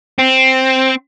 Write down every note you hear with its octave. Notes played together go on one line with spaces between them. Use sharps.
C4